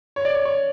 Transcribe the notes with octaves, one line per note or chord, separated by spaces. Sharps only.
C#5
D5
C#5
C#5